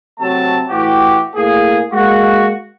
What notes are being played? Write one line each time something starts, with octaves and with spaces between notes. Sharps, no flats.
C3 F#3 A3 C4 A5
A2 E3 F#4 G4
A2 A#3 G#4
G#3 A#3 F#4